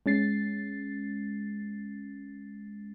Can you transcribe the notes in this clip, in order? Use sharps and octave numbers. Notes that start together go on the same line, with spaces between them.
G#3 C#4 A6 C7